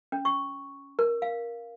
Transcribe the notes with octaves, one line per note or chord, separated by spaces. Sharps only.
C#4
C#6
A#4
F5